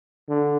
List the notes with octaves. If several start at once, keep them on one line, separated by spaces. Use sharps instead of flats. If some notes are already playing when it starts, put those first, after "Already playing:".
D3